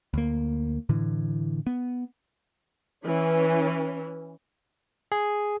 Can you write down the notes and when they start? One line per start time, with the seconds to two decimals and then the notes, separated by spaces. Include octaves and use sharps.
0.14 D2 A#3
0.89 A2 D3 E3
1.67 B3
3.05 E3 C#4
5.12 G#4